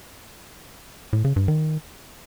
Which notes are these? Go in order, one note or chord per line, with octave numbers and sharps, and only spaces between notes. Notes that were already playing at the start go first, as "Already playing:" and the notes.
A2
C#3
G2
D#3